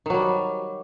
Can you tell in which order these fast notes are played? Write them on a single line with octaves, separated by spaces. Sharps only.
D#3 F#3 G3